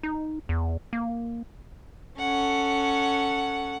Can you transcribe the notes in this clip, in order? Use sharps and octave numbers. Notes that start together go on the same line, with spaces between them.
D#4
E2
A#3
C#4 A4 F#5